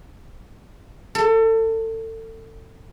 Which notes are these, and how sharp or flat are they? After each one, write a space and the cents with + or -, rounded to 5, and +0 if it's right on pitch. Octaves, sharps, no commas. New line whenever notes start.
A4 +30